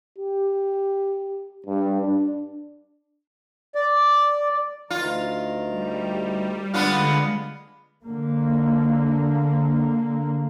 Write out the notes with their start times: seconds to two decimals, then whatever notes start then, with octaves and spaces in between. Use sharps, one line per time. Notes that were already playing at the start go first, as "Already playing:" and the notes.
0.18 G4
1.66 G2
2.01 D4
3.75 D5
4.90 D2 D#3 F4 A#5
5.70 G3
6.74 D3 G#3 B3 D4 F4
8.05 D3 A#3